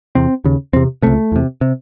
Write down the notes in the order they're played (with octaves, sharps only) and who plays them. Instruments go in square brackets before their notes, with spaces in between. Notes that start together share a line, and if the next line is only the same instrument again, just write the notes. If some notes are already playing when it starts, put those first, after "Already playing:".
[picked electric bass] E2 C3 C4
D#2 C#3
E2 C3 C4
C#2 C3 A3
E2 C3
C3